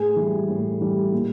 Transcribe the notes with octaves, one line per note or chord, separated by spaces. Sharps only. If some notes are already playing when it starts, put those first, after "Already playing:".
Already playing: A2 G#4
E3
G3
A2
E3 G3
A#2